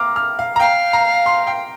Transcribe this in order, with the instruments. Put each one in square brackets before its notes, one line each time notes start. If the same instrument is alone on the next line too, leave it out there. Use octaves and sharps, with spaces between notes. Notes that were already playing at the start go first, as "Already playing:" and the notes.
Already playing: [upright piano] F5 A#5 D6 F6
F6
F5
A#5
[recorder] F5 [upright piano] G5
[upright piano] A#5
C6
G5